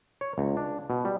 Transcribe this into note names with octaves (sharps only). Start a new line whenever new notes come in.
C#5
C#2
D4
B2
G3